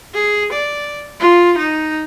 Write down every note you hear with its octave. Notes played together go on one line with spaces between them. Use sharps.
G#4
D5
F4
D#4